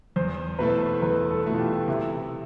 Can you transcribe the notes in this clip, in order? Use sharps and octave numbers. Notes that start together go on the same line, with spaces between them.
E2 C5
B2 A3 E4 A4 B4
E2 B4
A4
B2 A3 E4 A4
F4
G4
C3 E4